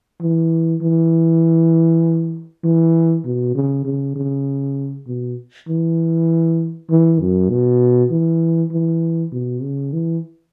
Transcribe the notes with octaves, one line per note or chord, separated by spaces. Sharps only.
E3
E3
E3
B2
C#3
C#3
C#3
B2
E3
E3
F#2
B2
E3
E3
B2
C#3
E3